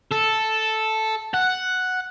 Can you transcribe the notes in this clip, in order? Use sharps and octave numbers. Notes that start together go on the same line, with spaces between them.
A4
F#5